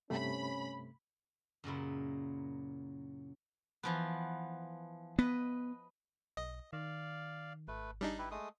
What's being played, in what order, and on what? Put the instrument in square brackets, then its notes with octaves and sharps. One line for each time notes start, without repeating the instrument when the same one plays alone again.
[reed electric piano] G2 C3 A3 [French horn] C#4 [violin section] B5
[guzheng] F#2 A#2 C#3 E4
E3 F3 B3
[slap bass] B3 [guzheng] B4 D#5
[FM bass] B1 [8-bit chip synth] D#5
[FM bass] D#3 [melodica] D5 F5
[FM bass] G#1 [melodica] A3 B4
[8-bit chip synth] G3 D4 D#4 [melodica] G#4
[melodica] E4 G4 B4
G#3 A3 D#6